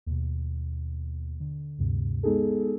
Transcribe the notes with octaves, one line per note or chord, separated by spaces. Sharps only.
D#2 B2
D3
D2 G2 C3
G#3 B3 D#4 G#4 A4